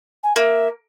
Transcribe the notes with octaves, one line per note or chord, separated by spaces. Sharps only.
G#5
A#3 E5